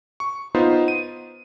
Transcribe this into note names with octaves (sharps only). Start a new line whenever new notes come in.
C#6
B3 D#4 F4 C5
D#7